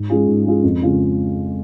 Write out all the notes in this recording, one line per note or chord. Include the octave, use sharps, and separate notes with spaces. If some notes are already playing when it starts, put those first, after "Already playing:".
Already playing: G#2
G#3 C#4 F4 G#4
G#2
G#3 C#4 F4 G#4
F2
C#3 G#3 C#4 F4